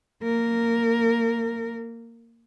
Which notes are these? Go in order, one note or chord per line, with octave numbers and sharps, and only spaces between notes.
A#3 A#4